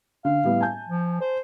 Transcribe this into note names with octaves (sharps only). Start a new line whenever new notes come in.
D3 F5
A2 G3 B3
G#5 A5 G6
F3
C5